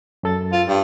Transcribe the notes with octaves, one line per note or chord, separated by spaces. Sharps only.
F#2 A4 A6
F4
G2